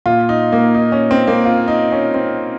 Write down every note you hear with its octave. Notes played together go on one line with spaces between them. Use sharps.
A#2 F4
D#4
A#3
D#4
C#4
C4
A#3
F4
D#4
C#4
C4